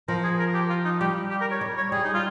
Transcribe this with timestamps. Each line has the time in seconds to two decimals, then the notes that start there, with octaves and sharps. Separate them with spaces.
0.08 F3 A#4
0.24 G#4
0.39 A#4
0.54 G4
0.69 F4
0.85 D#4
1.00 G3 G4
1.30 G4
1.41 A#4
1.51 C#5
1.61 G3
1.77 C#5
1.92 G3 G#4
2.04 D#4
2.14 F4